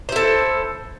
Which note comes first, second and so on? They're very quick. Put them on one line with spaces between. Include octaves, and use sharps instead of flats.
C5 E4 A4